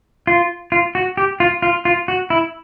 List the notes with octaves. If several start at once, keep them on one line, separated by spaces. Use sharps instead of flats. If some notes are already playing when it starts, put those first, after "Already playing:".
F4
F4
F#4
G4
F4
F4
F4
F#4
E4